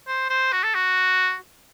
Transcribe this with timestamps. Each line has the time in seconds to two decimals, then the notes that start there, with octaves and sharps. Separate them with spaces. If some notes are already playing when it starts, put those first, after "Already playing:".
0.07 C5
0.30 C5
0.53 F#4
0.64 A4
0.75 F#4